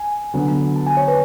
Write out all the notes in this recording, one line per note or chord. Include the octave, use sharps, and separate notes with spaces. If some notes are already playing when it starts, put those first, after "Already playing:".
Already playing: G#5
D3 F#3 B3 D4
A5
G#5
C#5
B4